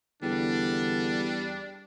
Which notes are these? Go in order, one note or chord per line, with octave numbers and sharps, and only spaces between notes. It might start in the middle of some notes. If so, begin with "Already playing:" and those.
E2 D3 G3 D4